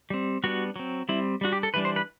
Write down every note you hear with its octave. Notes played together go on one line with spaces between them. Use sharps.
G3 C4
G3 B3 D4 F#4
F#3 C4
G3 C4 E4
G3 D4 F#4
G4
A4
E3 G3 D4 B4
C5
B4